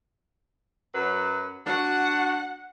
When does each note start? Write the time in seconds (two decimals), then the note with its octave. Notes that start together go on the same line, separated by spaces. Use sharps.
0.94 F#2 F#3 B4
1.66 D4 F#4 F#5